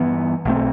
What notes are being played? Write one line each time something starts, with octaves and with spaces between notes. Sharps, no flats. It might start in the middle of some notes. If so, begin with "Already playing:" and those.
Already playing: G2 E3 B3
B1 B2 A3 C4